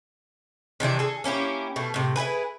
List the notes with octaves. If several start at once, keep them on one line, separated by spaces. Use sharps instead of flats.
C3 D#3 E3 D4
G#4 A4
A#3 C#4 E4 G4
B2 A3
A2 C3
E4 G4 G#4 B4